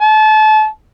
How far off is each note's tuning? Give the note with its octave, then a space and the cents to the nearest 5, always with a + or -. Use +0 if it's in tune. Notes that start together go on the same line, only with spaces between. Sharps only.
A5 -30